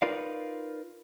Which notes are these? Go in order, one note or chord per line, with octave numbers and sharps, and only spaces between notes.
D#4 F4 A#4 B4 D5 F5